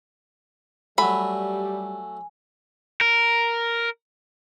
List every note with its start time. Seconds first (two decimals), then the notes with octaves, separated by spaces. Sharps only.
0.98 F#3 G3 A3 G#5 B5
3.01 A#4